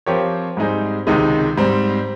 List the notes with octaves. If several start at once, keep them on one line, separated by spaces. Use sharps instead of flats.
F3 C4 G4 A#4 C#5
G#2 G3 C4 D#4 G#4
C#2 C3 D#3 G#3 D#4
G#2 G3 C4